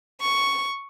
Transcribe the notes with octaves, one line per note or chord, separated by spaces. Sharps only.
C#6